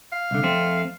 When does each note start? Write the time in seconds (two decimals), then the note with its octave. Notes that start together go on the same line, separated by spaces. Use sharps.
0.12 F5
0.31 C2 D3
0.43 F2 A3 C4